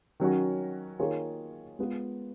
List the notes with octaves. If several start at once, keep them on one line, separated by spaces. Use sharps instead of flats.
D#3 F#3 C#4 F#4
D#3 A#3 F4 G#4 C#5
G#3 B3 F4